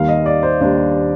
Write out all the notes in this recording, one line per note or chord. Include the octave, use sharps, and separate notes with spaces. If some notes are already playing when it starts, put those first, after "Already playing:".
Already playing: D#2 D#3 G3 F5
D#5
D5
C5
D#2 D#3 G3 D4